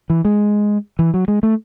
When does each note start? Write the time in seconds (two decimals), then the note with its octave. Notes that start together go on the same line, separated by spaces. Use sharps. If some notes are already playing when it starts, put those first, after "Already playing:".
0.10 E3
0.25 G#3
0.99 E3
1.14 F#3
1.28 G#3
1.43 A3